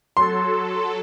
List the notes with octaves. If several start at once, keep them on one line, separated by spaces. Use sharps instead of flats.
F#3 A4 C6